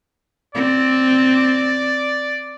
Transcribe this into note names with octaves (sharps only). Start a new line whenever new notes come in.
C4 D5